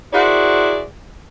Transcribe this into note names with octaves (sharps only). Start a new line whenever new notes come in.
E4 F#4 G#4 A#4 C5 D5